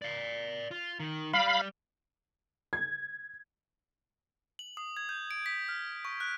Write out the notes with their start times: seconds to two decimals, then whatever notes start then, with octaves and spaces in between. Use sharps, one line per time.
0.02 D5 F5
0.71 F4
1.00 D#3
1.33 G3 F5 B5
2.73 G#6
4.59 F#7
4.77 D#6
4.97 G#6
5.09 G6
5.31 D7
5.46 B6
5.69 F6
6.05 C#6
6.20 F#6